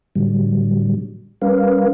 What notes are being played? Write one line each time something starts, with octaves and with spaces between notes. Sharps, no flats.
A2 D3 F#3 G3
G3 C#4 A#4 B4 F5